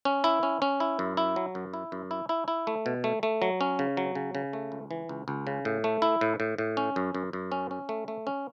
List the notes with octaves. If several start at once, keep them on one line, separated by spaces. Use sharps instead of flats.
C#4
E4
C#4
C#4
E4
F#2
E4
F#3
F#2
E4
F#2
E4
E4
E4
A3
B2
A3
A3
F#3
C#4
C#3
F#3
C#3
C#3
A3
C#2
E3
C#2
C#2
C#3
A2
A3
E4
A2
A2
A2
C#4
F#2
F#2
F#2
C#4
C#4
A3
A3
C#4